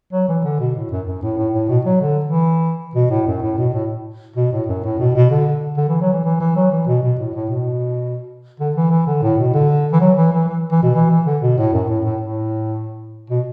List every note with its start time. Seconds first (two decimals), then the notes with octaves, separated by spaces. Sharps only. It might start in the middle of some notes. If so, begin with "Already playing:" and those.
0.12 F#3
0.28 E3
0.44 D3
0.60 B2
0.75 A2
0.91 F#2
1.07 F#2
1.22 A2
1.38 A2
1.54 A2
1.69 B2
1.85 F#3
2.01 D3
2.24 E3
2.95 B2
3.11 A2
3.27 F#2
3.42 A2
3.58 B2
3.73 A2
4.36 B2
4.52 A2
4.68 F#2
4.84 A2
4.99 B2
5.15 B2
5.31 D3
5.77 D3
5.89 E3
6.01 F#3
6.13 E3
6.25 E3
6.40 E3
6.56 F#3
6.71 E3
6.87 B2
7.03 B2
7.18 A2
7.34 A2
7.49 B2
8.60 D3
8.76 E3
8.91 E3
9.07 D3
9.22 A2
9.38 B2
9.54 D3
9.92 E3
10.01 F#3
10.17 E3
10.32 E3
10.48 E3
10.72 E3
10.83 B2
10.95 E3
11.10 E3
11.26 D3
11.42 B2
11.58 A2
11.73 F#2
11.88 A2
12.05 A2
12.21 A2
13.30 B2